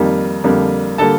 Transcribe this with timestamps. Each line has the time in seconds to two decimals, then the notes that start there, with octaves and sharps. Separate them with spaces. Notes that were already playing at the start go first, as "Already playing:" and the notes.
Already playing: F2 D#3 G3 A#3
0.44 F2 D3 G3 A#3
0.98 D3 G3 A#3 A4 A5